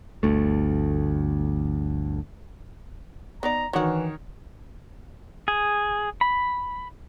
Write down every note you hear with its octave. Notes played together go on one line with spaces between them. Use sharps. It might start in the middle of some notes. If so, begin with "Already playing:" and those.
G1 D2 A3
B3 D#4 D5 A#5
D#3 E3 F#3 D4 F#4 C#5
G#4
B5